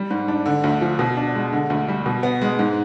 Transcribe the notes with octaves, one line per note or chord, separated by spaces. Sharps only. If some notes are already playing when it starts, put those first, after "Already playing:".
Already playing: G3
G#2
D4
D3
D2
F3
B2
D4
G#3
D3
D2
G3
B2
B3
G#3
G#2